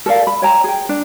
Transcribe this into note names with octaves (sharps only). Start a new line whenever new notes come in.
A4 A#4 D5 F5
B5
C#5 G5 A#5
G#4 G5
D4